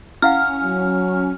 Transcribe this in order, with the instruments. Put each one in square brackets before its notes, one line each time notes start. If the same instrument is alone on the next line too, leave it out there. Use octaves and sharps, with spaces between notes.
[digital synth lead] C#4 [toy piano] E4 F5 F#5 [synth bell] F6
[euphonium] F#3